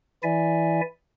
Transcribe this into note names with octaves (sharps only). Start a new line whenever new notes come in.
E3 E4 D5 E5 G#5